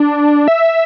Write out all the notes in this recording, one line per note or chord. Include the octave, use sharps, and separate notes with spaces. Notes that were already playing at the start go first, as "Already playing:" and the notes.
Already playing: D4
E5